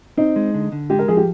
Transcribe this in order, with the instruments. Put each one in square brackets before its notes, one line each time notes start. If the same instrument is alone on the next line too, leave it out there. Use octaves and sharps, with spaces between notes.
[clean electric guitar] C4 [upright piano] D#4
[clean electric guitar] G#3
D3
D3
[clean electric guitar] G#3 [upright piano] G4
[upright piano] A#4
[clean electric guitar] F3 [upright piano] G#4
[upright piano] G4